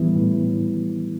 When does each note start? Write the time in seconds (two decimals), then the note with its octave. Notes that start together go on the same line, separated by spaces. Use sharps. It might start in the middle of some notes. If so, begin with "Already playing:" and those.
Already playing: A2 E3 G3 B3 E4
0.15 A2